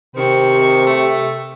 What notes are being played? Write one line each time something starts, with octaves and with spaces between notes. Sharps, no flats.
C3 D#3 C4 G4 C#6
A3